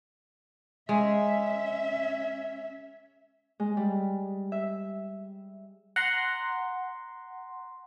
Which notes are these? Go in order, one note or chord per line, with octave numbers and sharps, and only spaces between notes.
G#3 C#4 E5
G#3
G3
E5
F#5 A#5 C6